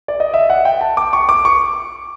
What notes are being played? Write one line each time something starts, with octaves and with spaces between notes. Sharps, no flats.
D5
D#5
E5
F#5
G5
A5
D6
C#6
D6
C#6